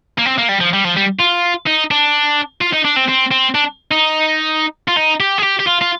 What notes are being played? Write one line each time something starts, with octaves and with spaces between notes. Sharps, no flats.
A#3
C4
A#3
G3
F3
G3
F3
G3
F4
D#4
D4
F4
D#4
D4
C4
C4
C4
D4
D#4
F4
D#4
G4
G#4
G4
G4
F4
F4